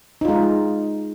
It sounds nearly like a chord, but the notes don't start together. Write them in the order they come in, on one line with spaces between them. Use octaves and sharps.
D#4 F4 G#3